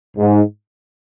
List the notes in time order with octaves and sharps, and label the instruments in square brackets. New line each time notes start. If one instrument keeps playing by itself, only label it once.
[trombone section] G#2